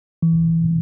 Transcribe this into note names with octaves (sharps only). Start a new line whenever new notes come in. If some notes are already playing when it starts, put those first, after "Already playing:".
E3